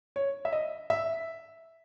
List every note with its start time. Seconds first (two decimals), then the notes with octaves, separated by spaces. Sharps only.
0.16 C#5
0.45 E5
0.53 D#5
0.90 E5